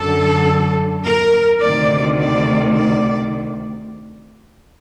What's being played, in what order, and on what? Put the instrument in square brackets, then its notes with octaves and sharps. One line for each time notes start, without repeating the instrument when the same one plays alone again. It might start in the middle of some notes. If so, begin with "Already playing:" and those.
Already playing: [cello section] F#2 D3 A4
A#4
D2 C3 D#3 D5
D5
D5